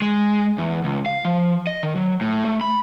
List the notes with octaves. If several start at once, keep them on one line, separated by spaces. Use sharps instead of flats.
G#3
E2
C#2
F5
F3
D#5
D#3
F#3
A2
A3
B5